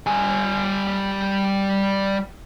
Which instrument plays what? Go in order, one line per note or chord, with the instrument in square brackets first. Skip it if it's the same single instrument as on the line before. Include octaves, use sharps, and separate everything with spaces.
[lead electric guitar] G3 G#5